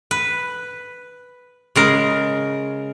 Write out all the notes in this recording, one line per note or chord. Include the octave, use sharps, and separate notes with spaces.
B4
C#3 G#3 A#4